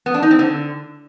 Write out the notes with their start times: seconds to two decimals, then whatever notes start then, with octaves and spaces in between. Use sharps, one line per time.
0.06 B3
0.14 D4
0.22 D#4
0.31 C4
0.39 D3